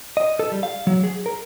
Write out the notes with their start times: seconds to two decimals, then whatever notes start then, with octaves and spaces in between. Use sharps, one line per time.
0.17 D#5
0.39 A4
0.52 G3
0.63 F5
0.87 F#3
1.04 G#4
1.26 A#4